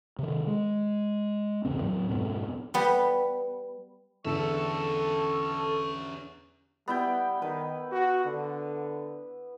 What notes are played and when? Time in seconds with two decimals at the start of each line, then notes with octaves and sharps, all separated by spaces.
0.19 C3 D#3
0.47 G#3
1.65 G1 E2 C#3 C4
1.82 A2 F#3
2.09 F2 G#2 B2 C4
2.74 G3 B3
4.25 E2 D3 C#4 A4 E5 C#6
6.88 G3 B3 E4 G5
7.42 D#3 B4
7.92 F#4
8.25 D3